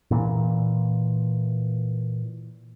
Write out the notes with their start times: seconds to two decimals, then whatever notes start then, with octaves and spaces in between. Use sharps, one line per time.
0.11 A#2 E3